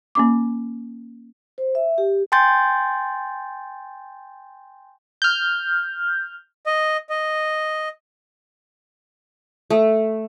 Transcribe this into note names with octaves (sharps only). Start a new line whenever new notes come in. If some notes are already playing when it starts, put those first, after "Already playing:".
A#3 C#4 D6
C5
E5
G4
G5 G#5 C6 G6 A6
F6 G6
D#5
D#5
A3